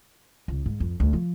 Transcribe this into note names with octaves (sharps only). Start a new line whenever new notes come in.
C#2
G#2
F2
D2
F3